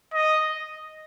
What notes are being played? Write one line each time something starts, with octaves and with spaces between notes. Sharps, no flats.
D#5